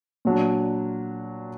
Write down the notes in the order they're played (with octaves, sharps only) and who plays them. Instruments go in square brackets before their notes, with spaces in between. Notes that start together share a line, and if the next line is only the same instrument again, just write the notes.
[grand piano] A#2 F#3 D4